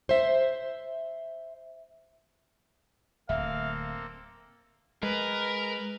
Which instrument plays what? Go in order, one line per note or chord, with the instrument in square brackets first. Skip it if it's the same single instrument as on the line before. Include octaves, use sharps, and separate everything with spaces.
[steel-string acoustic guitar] C5 E5
[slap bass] D1 [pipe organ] A#3 C4 A4 [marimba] E5 [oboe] F5
[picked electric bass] G#3 [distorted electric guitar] A#4 [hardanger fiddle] B4